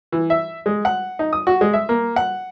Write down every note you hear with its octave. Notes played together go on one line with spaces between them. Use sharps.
E3
E5
G#3
F#5
D#4
D#6
F#4
G#3
E5
A#3
F#5